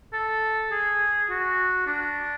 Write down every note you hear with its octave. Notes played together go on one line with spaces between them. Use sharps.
A4
G#4
F#4
D4